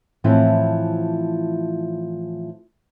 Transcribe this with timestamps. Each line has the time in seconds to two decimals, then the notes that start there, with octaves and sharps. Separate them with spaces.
0.24 A2 E3 F3 C4 E4